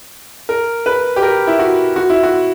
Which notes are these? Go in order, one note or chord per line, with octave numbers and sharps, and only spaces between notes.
A#4
B4
G4
A#4
E4
F#4
F#4
E4
F#4